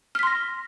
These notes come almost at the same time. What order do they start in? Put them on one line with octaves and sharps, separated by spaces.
F6 B6 C6 A#6